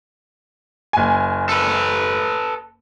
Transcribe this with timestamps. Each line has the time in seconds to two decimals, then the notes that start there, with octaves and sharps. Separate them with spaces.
0.93 F#1 G#5
1.49 A4 B4